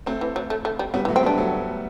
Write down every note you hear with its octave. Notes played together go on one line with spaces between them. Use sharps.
F#3 A3 C4
E3
F#3
A3
A3
G3
F#3 G3 B3
E3
F#3 A3
C4
G3 B3
D4
F#3 A3